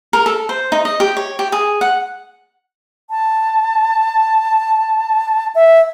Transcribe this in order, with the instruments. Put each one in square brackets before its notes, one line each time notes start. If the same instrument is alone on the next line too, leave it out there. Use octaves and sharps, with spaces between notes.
[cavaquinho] A#4
A4
C5
D#4
D#5
G4
C#5
G4
G#4
F#5
[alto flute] A5
E5